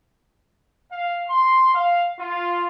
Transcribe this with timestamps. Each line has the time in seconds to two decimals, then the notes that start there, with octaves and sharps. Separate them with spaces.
0.92 F5
1.29 C6
1.73 F5
2.20 F4